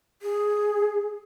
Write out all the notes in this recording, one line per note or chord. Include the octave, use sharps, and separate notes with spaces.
G#4